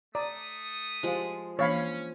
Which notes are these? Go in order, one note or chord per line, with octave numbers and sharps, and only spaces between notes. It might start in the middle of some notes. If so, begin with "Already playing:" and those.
A3 D5 A#5 D#6
F3 G#3 G4 F5
E3 A#3 C#4 D4 C#5 F5 B5